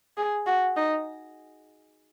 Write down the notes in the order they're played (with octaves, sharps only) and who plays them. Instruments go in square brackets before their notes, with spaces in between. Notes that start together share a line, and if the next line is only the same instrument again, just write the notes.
[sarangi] G#4
F#4
D#4